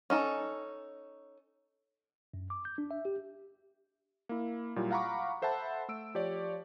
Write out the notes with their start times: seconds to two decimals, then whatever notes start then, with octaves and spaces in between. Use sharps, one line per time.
0.10 C#4 D#4 A4
2.34 F#2
2.50 D6
2.65 G6
2.78 D4
2.91 E5
3.05 G4
4.29 A#3 E4
4.76 A#2 F#3 G3 E4 F4
4.91 F5 F#5 A#5 B5 C#6 D6
5.42 A4 C5 E5 F#5 A5 B5
5.88 A3 E6 D7
6.15 F3 G4 C#5 D5